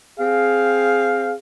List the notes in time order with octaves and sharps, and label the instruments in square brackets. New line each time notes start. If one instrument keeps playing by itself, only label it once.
[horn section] C4 G#4 F5